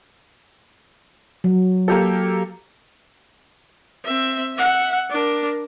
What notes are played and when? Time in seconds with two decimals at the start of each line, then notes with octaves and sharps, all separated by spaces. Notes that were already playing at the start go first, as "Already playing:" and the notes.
1.44 F#3
1.88 A#3 G4 A4
4.05 C4 E5
4.54 E5 F#5
5.10 D4 A#4